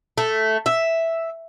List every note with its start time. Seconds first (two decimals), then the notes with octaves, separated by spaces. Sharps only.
0.18 A3
0.66 E5